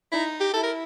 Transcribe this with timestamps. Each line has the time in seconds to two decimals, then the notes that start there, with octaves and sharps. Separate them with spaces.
0.12 D#4 E4
0.40 G4
0.54 E4 A4
0.63 A#4